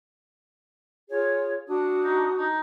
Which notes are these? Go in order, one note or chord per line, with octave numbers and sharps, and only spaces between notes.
F4 G#4 C#5
D4 F#4 D#6
D#4
D#4